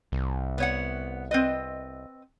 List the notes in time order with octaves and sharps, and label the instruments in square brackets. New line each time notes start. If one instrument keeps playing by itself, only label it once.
[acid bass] C2
[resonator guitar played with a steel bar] B3 C#5 F#5
C4 B4 D#5